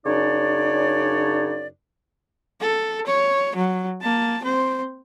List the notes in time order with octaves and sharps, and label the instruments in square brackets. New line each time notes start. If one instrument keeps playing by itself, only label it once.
[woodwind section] F#2 C#3 D4 D#4 C#5 D5
[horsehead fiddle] A4
C#5
F#3
A#3 A5
C4 C5